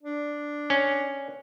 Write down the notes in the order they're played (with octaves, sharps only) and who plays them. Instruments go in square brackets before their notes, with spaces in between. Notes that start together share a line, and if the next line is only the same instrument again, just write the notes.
[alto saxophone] D4
[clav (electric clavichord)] C#4